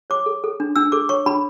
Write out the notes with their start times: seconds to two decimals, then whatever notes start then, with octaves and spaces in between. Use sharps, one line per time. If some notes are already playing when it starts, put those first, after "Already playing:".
0.10 C#5 D6
0.26 A4
0.44 A4
0.60 D4
0.76 D4 E6
0.92 A4 D6
1.09 C#5 C#6
1.26 D4 B5